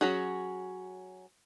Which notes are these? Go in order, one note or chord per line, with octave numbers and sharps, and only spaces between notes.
F#3 C#4 F#4 G#4